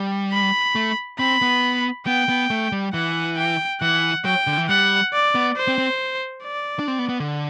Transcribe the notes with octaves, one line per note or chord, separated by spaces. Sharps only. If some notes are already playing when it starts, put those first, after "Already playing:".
Already playing: G3
B5
A3
C4 B5
B3
B3 G5
B3
A3
G3
E3 F#5
G5
E3 F#5
F#3 G5
D3
E3
G3 F#5
D5
B3
C5
C4
C4
D5
D4
C4
B3
B3
D3